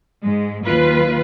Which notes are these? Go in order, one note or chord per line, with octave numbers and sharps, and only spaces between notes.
G#2 G#3
D#2 D#3 F#3 F4 B4